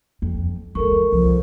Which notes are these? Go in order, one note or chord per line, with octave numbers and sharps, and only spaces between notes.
F2
E3 G#3 A4 A#4 C#6
C2 F3